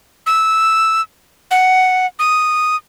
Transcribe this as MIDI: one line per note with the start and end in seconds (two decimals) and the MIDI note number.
0.26 1.01 88
1.51 2.06 78
2.19 2.76 87